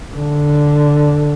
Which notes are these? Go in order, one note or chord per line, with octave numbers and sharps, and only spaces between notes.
D3